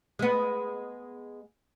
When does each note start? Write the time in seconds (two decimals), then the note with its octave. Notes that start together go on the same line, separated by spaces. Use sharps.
0.19 G#3 B3